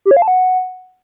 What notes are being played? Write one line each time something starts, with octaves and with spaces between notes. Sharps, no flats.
G4
C#5
F5
A5
F#5